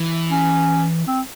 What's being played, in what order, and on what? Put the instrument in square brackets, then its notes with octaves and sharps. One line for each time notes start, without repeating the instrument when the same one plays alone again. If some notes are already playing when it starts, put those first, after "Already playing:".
Already playing: [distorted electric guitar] E3
[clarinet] C#4
C4